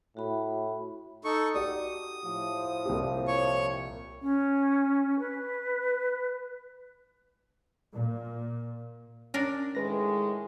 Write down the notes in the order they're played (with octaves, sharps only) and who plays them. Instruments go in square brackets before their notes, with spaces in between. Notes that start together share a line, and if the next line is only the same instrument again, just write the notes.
[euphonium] A2 [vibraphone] F#4 B5
[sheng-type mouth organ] D#4 A4 C#6
[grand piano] F#4 G4 D5 [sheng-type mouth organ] D#6
[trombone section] A2 F3
[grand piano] C2 A#2 G4
[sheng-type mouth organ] C#5 C#6
[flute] C#4
B4
[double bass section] A#2
[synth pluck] C#4 [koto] D4 A#4
[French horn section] A2 D#3 G#3 [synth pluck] B4 A#6